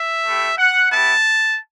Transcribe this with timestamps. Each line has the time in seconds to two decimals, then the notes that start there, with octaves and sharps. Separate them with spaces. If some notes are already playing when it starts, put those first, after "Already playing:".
Already playing: E5
0.26 A3 E4 G4
0.58 F#5
0.91 B3 E4 G4 A5